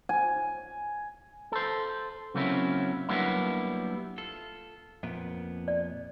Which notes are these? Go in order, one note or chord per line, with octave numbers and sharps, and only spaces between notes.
G#5
A4 C5
C#3 F#3 A#3 C4 C#4 E4
F#3 G3 A#3 B3 D4 E4
F4 A4
F2 A#2 B3 F5
D5